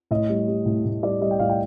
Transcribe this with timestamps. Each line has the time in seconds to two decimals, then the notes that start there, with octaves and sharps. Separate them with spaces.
0.11 A2 D#5
0.29 G3
0.48 G3
0.66 A2
0.85 A2
1.03 G3 D5
1.21 G3 D#5
1.31 G5
1.39 A2 F5
1.49 G5